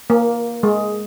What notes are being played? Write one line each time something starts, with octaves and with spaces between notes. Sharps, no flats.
A#3
G#3